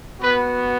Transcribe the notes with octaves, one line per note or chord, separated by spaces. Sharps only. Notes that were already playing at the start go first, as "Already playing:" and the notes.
B3 F#4 B4